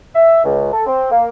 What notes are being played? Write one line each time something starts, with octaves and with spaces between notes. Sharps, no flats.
E5
C#2
A4
C4
A#3